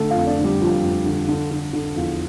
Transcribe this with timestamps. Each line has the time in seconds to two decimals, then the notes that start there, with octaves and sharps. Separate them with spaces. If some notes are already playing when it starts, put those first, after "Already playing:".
Already playing: D3 A3 A4
0.10 F4 F5
0.16 F2
0.27 D4 D5
0.39 D3
0.44 G3 G4
0.61 F2 F3 F4
0.83 F2
1.06 D3
1.28 D3
1.51 D3
1.73 D3
1.96 E2 F3 F4